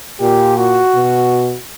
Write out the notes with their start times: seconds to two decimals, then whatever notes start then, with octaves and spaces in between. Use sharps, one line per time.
0.20 A#2 G4
0.57 F#4
0.95 B2